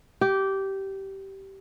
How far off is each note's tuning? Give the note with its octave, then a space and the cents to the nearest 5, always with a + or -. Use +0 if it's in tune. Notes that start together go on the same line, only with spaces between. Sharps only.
G4 -15